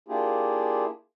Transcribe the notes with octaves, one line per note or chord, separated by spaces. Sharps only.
A#3 D4 E4 F4 G4 G#4